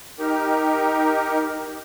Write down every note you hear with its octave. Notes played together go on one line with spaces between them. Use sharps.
D#4 G4 A#4